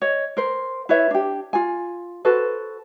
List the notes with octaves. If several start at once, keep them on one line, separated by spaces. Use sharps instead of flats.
C#5 D#5
A#4 C5
E4 B4 C#5 E5
D4 G4
F4 G#5
F#4 A4 B4 C5